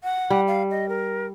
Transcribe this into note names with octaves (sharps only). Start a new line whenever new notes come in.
F#5
G3
F5
D#5
A#4